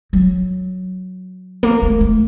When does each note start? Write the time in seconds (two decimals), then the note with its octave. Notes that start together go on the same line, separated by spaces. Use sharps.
0.13 F#3
1.63 A#3
1.82 A3
2.01 A3